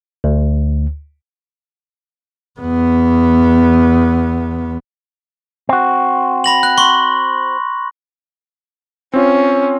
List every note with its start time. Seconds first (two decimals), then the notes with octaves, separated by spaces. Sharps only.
0.24 D2
2.60 E2 B3
5.69 C4 F#4
6.44 B5 A#6 F#7
6.63 F#6
6.78 C6 C#6
9.14 C4 C#4 F4